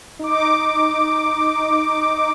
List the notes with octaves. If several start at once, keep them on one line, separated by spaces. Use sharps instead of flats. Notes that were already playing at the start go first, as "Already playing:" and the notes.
D#4 D6